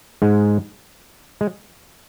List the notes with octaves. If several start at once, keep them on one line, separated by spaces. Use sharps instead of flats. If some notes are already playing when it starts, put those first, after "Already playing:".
G#2 G#3
G#3